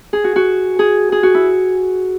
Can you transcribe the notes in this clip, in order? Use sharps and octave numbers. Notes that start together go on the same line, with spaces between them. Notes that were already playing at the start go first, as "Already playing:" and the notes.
G#4
F#4
F#4
G#4
G#4
F#4
E4